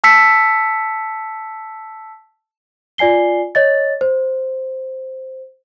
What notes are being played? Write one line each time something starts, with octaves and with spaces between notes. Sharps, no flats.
A5 E6 B6 C#7
F4 D5 G#5 C7 G7
C#5 D#5 A6
C5